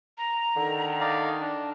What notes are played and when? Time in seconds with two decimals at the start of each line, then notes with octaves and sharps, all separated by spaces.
0.18 A#5
0.56 D3 D#3
1.00 D5 D#5 F5
1.41 D4